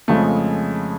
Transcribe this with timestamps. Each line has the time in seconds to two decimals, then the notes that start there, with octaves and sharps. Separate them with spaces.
0.08 F2 C#3 F3 G#3 A3